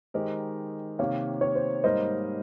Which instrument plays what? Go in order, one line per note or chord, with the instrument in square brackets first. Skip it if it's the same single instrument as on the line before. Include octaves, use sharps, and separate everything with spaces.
[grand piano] D#3 G#3 D#4 G4 A#4 [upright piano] C5 D#5
[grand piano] C3 D#3 A#3 [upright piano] C#5 F5
[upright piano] C#5
C5
[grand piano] G#2 G3 A#3 D#4 A#4 [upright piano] C5 D#5